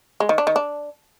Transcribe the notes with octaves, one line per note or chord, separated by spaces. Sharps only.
G#3
D#3
D4
D#3
D4